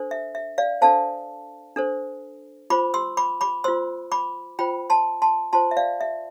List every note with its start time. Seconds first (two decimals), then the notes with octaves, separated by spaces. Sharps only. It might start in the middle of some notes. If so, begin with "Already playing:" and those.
Already playing: D4 A4 C5
0.11 E5
0.35 E5
0.58 D5 F5
0.81 D4 A4 C5 F5 A5
1.76 D4 A4 C5
2.70 F4 C5 B5 D6
2.94 C6 E6
3.17 B5 D6
3.41 B5 D6
3.64 F4 C5 C6 E6
4.12 B5 D6
4.59 F4 C5 G5 B5
4.90 A5 C6
5.22 A5 C6
5.53 F4 C5 A5 C6
5.71 E5
5.77 D5 F5
6.01 E5